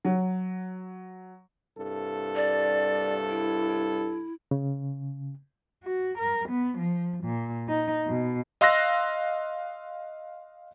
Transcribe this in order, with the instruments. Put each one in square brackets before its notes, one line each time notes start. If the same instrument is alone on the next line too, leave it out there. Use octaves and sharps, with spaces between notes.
[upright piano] F#3
[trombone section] C2 G2 A4
[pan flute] D5
E4
[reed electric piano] C#3
[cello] F#4
A#4
B3
F3
A#2
D#4
B2
[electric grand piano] D#5 F5 C6 E6 F#6 A#6